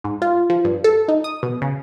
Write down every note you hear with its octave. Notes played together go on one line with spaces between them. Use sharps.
G#2
F4
F3
G2
A4
D#4
D#6
B2
C#3